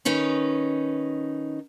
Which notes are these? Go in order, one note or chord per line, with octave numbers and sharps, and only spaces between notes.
D#3 C#4 D#4 B4